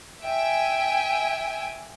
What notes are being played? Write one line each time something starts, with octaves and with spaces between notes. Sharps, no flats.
E5 G5 G#5